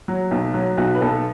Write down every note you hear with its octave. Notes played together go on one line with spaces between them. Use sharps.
F#3
B1
F#3
B1 F#4
B4
B1 A4